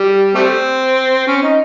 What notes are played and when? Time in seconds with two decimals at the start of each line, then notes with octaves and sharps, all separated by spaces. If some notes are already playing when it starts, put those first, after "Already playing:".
Already playing: G3
0.35 G3 A3 C4
1.27 C#4
1.43 D#4